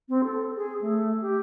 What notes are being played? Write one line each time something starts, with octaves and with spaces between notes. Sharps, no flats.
C4
A4
G#4
A3
G4